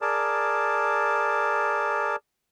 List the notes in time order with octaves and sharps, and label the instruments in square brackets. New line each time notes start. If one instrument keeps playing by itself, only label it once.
[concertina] G#4 A#4 D5 A5